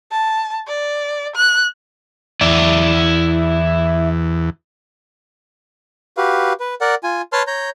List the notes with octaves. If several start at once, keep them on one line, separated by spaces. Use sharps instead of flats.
A5
D5
F#6
E2 E4 D5
F#4 G4 B4 F5
B4
A#4 D5 F#5
F4 G#5
B4 C#5 A5 C6 F6
C#5 A#5 G6